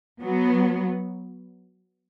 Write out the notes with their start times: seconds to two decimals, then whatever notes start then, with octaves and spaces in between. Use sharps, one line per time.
0.22 F#3 B3